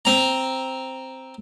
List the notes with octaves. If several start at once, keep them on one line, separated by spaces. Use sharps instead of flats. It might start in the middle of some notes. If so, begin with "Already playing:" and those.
C4 A#5